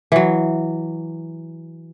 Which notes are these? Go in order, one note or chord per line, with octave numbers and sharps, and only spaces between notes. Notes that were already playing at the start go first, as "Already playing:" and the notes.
E3 F#3